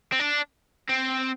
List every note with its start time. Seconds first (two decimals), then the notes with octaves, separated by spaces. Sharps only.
0.12 C4
0.19 D4
0.89 C4